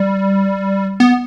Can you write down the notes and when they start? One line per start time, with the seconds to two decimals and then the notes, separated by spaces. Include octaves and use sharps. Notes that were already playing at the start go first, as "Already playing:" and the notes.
Already playing: G3
1.00 B3